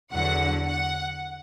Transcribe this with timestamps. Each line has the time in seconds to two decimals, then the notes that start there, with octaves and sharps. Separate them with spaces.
0.12 E2 D3 F#3 F#5
0.66 F#5